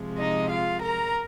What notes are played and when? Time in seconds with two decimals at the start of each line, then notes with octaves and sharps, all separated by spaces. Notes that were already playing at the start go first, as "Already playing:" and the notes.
Already playing: C3 F3 G#3
0.18 D#4 D#5
0.51 F4 F5
0.83 A#4 A#5